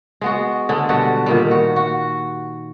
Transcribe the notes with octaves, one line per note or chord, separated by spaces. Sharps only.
G#3 B3 F#4
D3 G#3
B2 G3 D4 F#4
A#2 D#3 G3
F#4
F#4